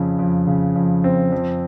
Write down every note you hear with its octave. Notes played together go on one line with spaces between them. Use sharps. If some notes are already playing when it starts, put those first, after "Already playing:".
Already playing: F2 C#3
F2
C#3
F2
C4
F2